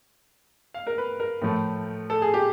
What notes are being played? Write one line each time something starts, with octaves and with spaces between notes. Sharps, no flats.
F5
A#4
B4
A#4
A2 F3 A3
A4
G#4
G4